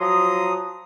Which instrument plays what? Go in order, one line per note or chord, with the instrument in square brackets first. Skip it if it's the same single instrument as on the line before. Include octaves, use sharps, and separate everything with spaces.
[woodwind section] F3 F#3 A#5 C6 D#6